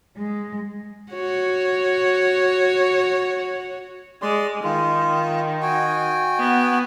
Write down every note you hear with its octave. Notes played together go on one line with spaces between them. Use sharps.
G#3
F#4 C#5
G#3 D5 C6
D#3 F4
F#4 G5 G#5
B3